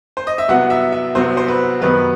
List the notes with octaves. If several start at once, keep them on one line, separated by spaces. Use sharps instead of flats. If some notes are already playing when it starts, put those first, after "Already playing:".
C5
D#5
E5
C2 C3 F#3 B3 F#5
E5
E5
C2 C3 F#3 B3 C5
C5
B4
F#2 D#3 G3 B3 B4